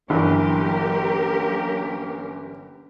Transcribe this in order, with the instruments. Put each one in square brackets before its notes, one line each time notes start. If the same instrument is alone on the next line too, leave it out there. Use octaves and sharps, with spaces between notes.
[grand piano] G1 E3 B5 [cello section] F#3 G4 A#4 [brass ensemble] A#3 C#4